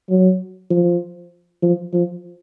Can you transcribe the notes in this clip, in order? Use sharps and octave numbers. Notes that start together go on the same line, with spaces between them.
F#3
F3
F3
F3